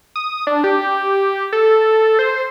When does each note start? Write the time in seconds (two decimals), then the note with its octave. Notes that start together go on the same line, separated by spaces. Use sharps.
0.16 D#6
0.47 D4
0.64 G4
1.53 A4
2.19 C5